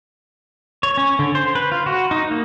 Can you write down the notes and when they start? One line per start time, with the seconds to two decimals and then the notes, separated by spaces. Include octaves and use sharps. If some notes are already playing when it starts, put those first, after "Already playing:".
0.83 C#5
0.97 C#4
1.19 D3
1.35 C5
1.55 B4
1.72 F4
1.86 F#4
2.11 D#4
2.31 A#3